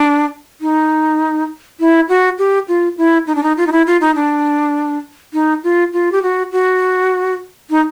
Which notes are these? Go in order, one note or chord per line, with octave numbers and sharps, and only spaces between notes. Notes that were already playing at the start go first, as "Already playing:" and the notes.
Already playing: D4
D#4
E4
F#4
G4
F4
E4
D#4
D4
D#4
F4
D#4
E4
F4
D#4
D4
D#4
F4
F4
G4
F#4
F#4
D#4